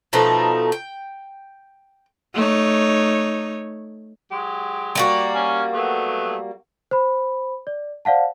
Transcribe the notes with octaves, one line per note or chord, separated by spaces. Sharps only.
B2 F3 A3 D#4
G5
A3 D#4 C#5
F#3 G#3 G4
G3 A#3 F#4
C#4
F#3 A3 B3
C5 B5
D5
C5 D5 F5 F#5 A5